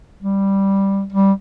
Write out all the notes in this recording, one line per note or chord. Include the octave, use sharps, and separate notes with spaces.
G3
G3